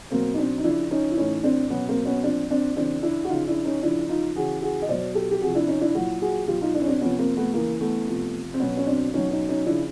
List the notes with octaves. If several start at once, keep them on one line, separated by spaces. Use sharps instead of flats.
B2 F#3 A#3 C4
D#4
C4 D4
D#4
C#3 F3 D4 E4
C#4 D#4
E4
A2 E3 C#4 D#4
C4 D4
B2 F#3 B3 C#4
A#3 C4
B3 C#4
A#2 F3 C4 D4
C4 D4
C#3 E3 C4 D4
D4 E4
F#4
C#3 F3 D#4 F4
D4 E4
C#4 D#4
C#3 F3 D4 E4
D#4 F4
C#3 E3 F#4 G#4
F#4 G#4
D#5
B2 F#3 C5 D5
G4 A4
G4
C3 F3 F#4 G#4
D4 E4
C#4 D#4
D4 E4
A#2 F#3 E4 F#4
F#4 G#4
B2 F#3 F4 G4
D#4 F4
D4 E4
C#4
C4 D4
C3 F3 B3 C#4
A#3 C4
A3 B3
C#3 E3 A#3
A3 B3
C3 F3
C4
B2 F#3 B3 C#4
C#4
C4 D4
B2 F#3 C#4 D#4
C#4 D#4
C#4 D#4
C#3 F3 D4 E4